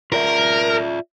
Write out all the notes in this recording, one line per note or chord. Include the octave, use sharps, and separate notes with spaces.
F4 A#4 D5 E5